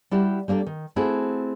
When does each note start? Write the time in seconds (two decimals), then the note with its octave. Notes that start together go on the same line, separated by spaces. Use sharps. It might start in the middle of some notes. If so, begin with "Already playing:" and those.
0.11 G3 E4 F#4 G4
0.48 G3 A#3 C4 D4 A4
0.66 D#3
0.96 A3 C4 E4 F#4 G#4